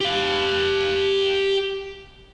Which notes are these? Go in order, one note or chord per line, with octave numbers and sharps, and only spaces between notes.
G4 F5